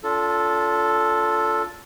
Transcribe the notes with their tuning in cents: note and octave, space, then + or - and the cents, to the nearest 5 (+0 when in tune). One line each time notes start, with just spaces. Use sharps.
D4 -40 F4 +0 A4 +0